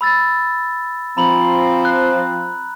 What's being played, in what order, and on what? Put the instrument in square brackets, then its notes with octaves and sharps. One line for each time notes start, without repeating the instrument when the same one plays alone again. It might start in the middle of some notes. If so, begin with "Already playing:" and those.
[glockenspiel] B5 E6 A6
[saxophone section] F3 C4 [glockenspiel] A#5 B5 F#7
[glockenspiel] F#6